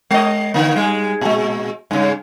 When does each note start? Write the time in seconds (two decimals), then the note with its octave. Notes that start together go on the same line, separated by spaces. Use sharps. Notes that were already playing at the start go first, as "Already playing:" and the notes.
0.11 G#3 D#5
0.54 D3 A#3
0.76 G3 G#3
1.21 A#2 G#3
1.91 G2 C#3